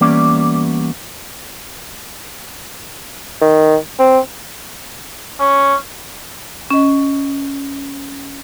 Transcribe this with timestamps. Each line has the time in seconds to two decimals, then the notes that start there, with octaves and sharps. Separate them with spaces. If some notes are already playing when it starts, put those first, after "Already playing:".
0.01 E3 G3 A#3 B3 C#4 D5
3.41 D#3
3.99 C4
5.40 C#4
6.70 C#4 D#5